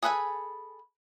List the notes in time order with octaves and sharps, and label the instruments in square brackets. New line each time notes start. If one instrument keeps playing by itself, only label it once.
[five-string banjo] G#4 A4 B4 F#5 G#5